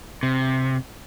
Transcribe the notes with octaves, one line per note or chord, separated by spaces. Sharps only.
C3